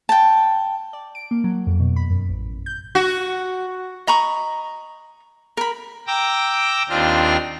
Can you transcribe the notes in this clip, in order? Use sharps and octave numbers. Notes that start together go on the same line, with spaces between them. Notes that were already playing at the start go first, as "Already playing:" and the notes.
G5 A5
D5
D7
A#3
F#3
F2
B2
B5
F#2
A1
G6
F#4
D#5 A#5 B5 C#6
A#4 B5
G5 A#5 D6 E6
D#2 C4 D4 F4 F6